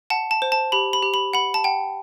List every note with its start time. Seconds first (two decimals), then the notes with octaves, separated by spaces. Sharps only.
0.10 F#5 A5
0.31 A5
0.42 C5
0.52 A5
0.72 G4 B5
0.93 B5
1.03 G4
1.14 B5
1.33 F#5 B5
1.54 A5
1.64 F#5 G5